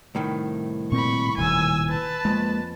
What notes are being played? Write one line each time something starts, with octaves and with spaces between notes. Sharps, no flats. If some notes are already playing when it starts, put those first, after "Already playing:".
C2 A2 D#3
A#2 C4 B5 C#6
D#1 D#2 G#5 E6
B4 A5
F2 G#3 A#3